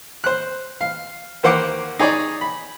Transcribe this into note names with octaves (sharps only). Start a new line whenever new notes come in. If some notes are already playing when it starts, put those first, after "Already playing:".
C5 F#6
F5
D#2 A#3 C5 F#5 C6 D6
D#4 G#4 C#5 D5
B5